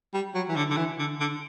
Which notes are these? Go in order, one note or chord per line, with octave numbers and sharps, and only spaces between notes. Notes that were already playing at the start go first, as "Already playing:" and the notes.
G3
F#3
E3
D3
D3
E3
D3
D3